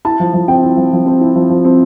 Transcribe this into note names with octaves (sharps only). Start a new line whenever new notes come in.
E4 A5
F3
F3
C4 G5
E4
F3
F3
C4
E4
F3
F3
C4